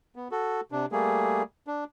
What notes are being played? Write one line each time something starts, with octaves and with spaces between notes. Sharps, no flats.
B3
F#4 A4
C3 D4
G3 A3 A#3 G#4
D4